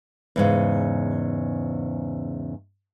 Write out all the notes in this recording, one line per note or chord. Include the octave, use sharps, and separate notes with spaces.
E2 G#2 C#3